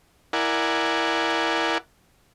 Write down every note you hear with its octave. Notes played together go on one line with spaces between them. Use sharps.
E4 A#4 D5 F#5 G#5